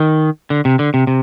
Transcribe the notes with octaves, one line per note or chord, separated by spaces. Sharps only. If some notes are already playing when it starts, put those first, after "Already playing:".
Already playing: D#3
D3
C3
D3
C3
C3